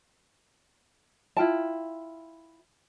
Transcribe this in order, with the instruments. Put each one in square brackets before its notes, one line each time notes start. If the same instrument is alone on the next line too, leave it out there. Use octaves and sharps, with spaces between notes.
[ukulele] E4 F4 G5 A5